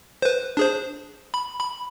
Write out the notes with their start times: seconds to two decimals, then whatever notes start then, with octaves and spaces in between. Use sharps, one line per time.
0.22 B4 C5
0.57 D4 G#4 C5
1.34 B5
1.60 B5